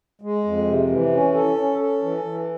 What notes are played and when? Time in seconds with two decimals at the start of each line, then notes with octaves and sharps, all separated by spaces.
0.21 G#3
0.44 F2
0.66 C3
0.90 E3
1.12 C#4
1.34 A4
1.57 C#4
1.79 A4
2.02 E3
2.24 E3